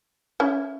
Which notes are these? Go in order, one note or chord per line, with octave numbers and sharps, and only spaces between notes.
C#4 E4